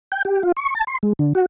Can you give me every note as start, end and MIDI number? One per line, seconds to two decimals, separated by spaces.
0.12 0.23 79
0.25 0.42 67
0.43 0.52 65
0.57 0.74 85
0.75 0.84 81
0.87 0.98 84
1.03 1.13 56
1.19 1.33 50
1.35 1.46 66